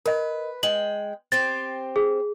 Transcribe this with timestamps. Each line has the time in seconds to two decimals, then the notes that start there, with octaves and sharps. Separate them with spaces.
0.06 A#4 B4 D#5
0.63 G#3 G5 F#7
1.32 C4 G4 C5 A6
1.96 G#4